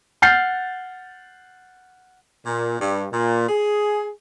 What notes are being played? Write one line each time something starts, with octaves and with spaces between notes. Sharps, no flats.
F#5 F6 G6 A6 C7
A#2
G2
A#2
G#4